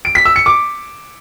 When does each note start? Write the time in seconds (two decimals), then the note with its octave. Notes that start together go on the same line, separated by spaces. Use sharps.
0.05 D7
0.15 B6
0.25 E6
0.36 C#7
0.46 D6